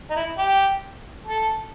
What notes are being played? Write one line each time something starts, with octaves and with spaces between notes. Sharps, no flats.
D#4
E4
G4
A4